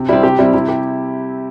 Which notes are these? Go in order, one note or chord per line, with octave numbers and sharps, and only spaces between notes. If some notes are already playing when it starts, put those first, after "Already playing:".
Already playing: C3
G3 C4 E4
C3 G4
G3 C4 E4
C3 E4
G4